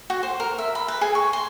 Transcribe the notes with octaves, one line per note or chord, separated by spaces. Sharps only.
F#4
C5
A#4
E5
B5
B4
G#4
C#6
C6